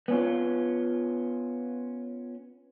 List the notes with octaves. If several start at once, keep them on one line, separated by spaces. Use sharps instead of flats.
B3 C#4 F4